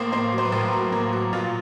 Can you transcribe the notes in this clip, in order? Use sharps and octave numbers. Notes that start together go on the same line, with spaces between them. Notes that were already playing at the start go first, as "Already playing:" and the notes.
Already playing: A2 A#3 C5
A#3 C5
F#3
C5
B4
A2 A#4
F#3
A#3
F#3
A#2 F4